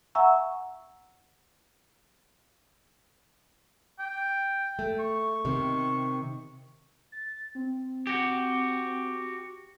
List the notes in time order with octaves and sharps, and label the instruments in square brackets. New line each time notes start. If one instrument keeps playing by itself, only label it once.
[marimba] E5 F#5 G#5 A#5 C#6 E6
[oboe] G5
[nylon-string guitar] A3
[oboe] C#6
[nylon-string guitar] C3 D#3
[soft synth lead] A6
C4
[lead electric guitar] F#4 G4